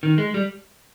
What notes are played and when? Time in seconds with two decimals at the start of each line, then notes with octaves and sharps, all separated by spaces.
0.03 D#3
0.18 G#3
0.34 G3